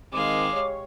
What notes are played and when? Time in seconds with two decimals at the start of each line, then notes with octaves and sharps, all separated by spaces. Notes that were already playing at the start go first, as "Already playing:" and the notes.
0.13 D#3 G#3 C4 F5 D6
0.53 G4 C#5